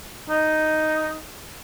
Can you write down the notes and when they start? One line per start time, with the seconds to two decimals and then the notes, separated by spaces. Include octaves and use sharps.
0.29 D#4